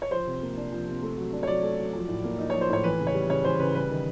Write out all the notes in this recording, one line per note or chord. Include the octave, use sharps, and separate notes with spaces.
C#5
F3 C5
C3
A#3
D4
F3
C3
A3
F#3
D4
C#5
F#3 D5
A3
F#3
F3
A2
A#3
D#4
C#5
F3
C5
A2 C#5
E3 B4
C#3
C#5
G3
C#3 C#5
E3 C5
C#3 B4
G3 B4
D#3